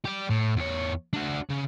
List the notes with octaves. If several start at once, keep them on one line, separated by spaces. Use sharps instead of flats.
G4 D5
A2
E2 C#5
D4 F#4
C#3